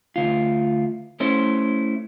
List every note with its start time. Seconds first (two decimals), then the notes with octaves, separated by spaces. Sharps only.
0.16 D2 F4
1.20 A3 C#4 E4 C5